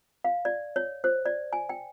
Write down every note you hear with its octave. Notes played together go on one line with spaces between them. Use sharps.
F5
D5
C#5
C5
D5
G#5
G5